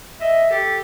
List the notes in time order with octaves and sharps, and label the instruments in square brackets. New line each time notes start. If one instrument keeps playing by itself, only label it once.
[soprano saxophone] D#5 [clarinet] E5
[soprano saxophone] G4 [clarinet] A4